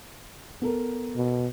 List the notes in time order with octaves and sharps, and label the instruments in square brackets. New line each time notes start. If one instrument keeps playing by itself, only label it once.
[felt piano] B3 A4 A#4
[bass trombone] B2